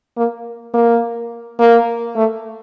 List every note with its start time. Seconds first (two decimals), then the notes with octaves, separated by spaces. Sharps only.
0.17 A#3
0.74 A#3
1.59 A#3
2.16 A3